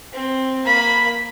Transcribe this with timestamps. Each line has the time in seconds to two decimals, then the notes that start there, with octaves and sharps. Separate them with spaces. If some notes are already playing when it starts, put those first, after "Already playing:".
0.13 C4
0.65 A#3 B5